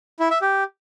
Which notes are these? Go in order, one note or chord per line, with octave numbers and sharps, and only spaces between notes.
E4
E5
G4